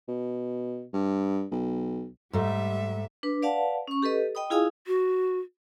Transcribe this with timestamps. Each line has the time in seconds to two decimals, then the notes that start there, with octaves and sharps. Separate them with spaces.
0.08 B2
0.94 G2
1.51 B1
2.33 G#2 G3 A3 E5
3.23 D4 B4
3.42 B4 D5 F5 F#5 A5
3.88 C#4 C#6
4.02 G4 A4 B4 D#5
4.35 D#5 G5 B5 D#6
4.50 E4 F4 G#4 F5 G#5 D#6
4.87 F#4